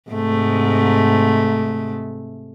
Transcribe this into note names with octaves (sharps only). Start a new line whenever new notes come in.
G#2 C3 A3